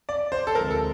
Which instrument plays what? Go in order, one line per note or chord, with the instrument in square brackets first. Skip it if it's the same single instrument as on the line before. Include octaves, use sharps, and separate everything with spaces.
[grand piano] D5
C5
A4
[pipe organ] D2 C3 F3 G#3 [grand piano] A#4
[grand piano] A4